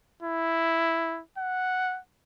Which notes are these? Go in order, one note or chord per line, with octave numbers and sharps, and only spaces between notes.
E4
F#5